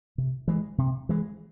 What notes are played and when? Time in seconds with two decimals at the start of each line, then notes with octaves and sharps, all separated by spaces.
0.18 C3
0.48 E3 G#3
0.78 C3
1.09 E3 G#3